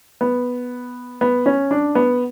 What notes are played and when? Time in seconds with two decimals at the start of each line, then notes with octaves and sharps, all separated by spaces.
0.21 B3
1.21 B3
1.46 C#4
1.71 D4
1.95 B3